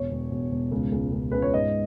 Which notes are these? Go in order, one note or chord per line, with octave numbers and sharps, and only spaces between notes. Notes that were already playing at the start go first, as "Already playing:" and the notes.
Already playing: E1 C#5
E1
E1
E1
C#2
C#2
C#2
C#2 B4
C#5
G#2 D#5